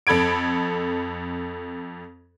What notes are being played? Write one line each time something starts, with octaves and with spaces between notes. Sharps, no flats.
F2 A4 B5 G#6 D7